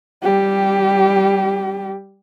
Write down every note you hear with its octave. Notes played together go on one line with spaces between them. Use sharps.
G3 G4